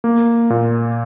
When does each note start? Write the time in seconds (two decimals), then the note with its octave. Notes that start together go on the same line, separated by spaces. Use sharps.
0.04 A#3
0.50 A#2